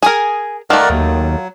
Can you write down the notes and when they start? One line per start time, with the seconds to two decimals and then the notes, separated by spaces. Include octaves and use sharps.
0.03 G#4 A#4 G#5 D#6
0.70 D#3 A3 F4 A#4 D5 F#5
0.90 D#2 F#3